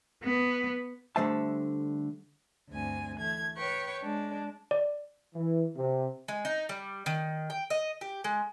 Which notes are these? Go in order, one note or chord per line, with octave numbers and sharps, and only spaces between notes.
B3
D3 G3 A3 C5 E5 A5
D2 G2 C4 G#5
E3 A3 G#6
B4 C#5 G5 C#6
G#3 D4
D5
E3
C3
G#3
D#4
G3
D#3
G5
D#5
G4
G#3